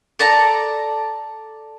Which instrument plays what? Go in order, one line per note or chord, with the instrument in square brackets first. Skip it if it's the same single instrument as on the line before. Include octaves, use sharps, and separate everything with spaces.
[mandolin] A4 D5 A5 A#5